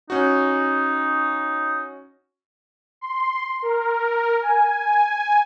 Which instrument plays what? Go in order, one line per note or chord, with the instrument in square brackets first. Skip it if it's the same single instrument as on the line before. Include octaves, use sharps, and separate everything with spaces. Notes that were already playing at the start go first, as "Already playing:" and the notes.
[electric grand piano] C#4 F#4 [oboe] D#4
[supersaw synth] C6
A#4
G#5